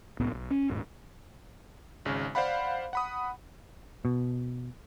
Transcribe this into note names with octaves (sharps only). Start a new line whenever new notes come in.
C2 A2 B3
B1
C#4
D#1 G#2
G#1 C#3
C5 D5 F5 F#5 B5
F#5 B5 D#6
B2